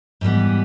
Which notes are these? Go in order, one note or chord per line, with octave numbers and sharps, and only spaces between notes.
G#2 E3 G3 B3